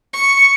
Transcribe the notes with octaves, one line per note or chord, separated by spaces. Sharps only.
C#6